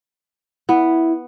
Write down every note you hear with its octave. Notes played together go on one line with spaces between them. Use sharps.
B3 E4